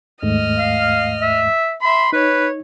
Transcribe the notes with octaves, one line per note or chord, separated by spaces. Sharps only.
D#2 G#2 A3 D#5 F6
F5
E5
E5 B5 C6
D#4 B4 C#5